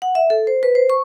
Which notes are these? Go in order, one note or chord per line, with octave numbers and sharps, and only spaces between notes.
F#5
E5
A4
C5
B4
C5
C#6